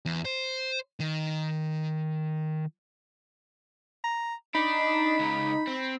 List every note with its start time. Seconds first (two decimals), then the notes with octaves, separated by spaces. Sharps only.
0.06 E2
0.25 C5
1.00 D#3
4.04 A#5
4.55 D4 D#4 B5
5.19 C#2 C#3
5.67 C4